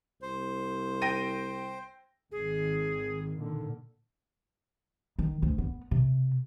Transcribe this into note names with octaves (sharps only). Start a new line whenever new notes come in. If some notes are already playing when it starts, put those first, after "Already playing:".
C2 C5
G5 A#6 D#7
G#1 D#3 G#4
A#2 D3 D#3
D#3
D2
B3
C3